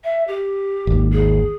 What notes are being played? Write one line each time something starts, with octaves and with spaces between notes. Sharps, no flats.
E5
G4
G#1 D#2
G#4